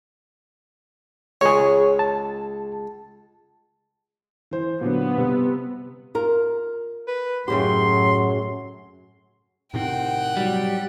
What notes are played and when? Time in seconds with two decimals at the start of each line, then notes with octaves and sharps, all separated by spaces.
1.41 C#2 G#3 G#4 C#5
1.99 A5
4.51 E3 C5
4.81 A#2 D3 F#3 B3
5.18 C3 G3
6.15 F4 A#4
7.07 B4
7.48 F#2 A2 C#3 F#3 G4 C6
9.74 A2 C3 D#3 C4 F#5 G5
10.37 F#3 G3